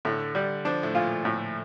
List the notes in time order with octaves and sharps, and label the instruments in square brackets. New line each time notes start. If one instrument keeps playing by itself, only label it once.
[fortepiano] A2 [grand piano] D3
[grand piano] D3 [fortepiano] G3
[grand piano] F3 [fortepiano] D4
[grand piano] A2
[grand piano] A#2 [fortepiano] F4
[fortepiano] A2